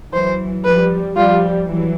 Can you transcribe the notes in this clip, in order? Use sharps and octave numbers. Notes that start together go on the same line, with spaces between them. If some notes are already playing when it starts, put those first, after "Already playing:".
E3 F#3 C5
F3 G3 B4
F3 G3 F4
E3 F#3